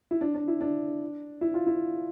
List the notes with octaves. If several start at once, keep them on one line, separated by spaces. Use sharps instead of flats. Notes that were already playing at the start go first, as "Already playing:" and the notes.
E4
D4
D4
E4
D4
E4
F4
E4